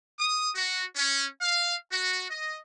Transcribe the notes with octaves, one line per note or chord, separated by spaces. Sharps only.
D#6
F#4
C#4
F5
F#4
D#5